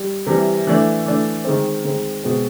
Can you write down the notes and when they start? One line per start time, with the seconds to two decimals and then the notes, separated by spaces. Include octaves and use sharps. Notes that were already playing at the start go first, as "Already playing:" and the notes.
Already playing: G3
0.27 C3 E3 G3
0.67 E3 A3 D4
1.06 E3 A3 D4
1.44 D#3 G#3 C4
1.84 D#3 G#3 C4
2.24 B2 G#3 C4